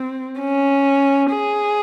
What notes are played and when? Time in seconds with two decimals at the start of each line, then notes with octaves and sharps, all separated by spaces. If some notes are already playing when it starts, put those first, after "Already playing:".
Already playing: C4
0.40 C#4
1.31 G#4